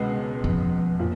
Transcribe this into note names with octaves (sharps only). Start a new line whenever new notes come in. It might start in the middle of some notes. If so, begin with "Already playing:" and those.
Already playing: C#2 B2 G#3 B3
F2
A#2 F3